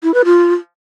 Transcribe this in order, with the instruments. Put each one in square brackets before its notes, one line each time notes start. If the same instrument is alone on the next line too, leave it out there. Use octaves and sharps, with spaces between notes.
[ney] E4
B4
F4